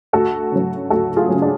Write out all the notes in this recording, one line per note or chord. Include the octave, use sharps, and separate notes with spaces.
D2 F#4 A4
C#3 F#3
D2 F#4 A4
F4 G#4
C#3 F#3
D4